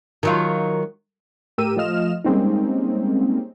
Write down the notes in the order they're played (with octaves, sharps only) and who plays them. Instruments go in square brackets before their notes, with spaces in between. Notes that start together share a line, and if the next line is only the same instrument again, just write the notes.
[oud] D#3 F#3 F4
[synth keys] A2 G4 A#4 E6 D#7
F3 A3 F4 D#5 F6 E7
G3 G#3 A#3 C4 C#4 D#4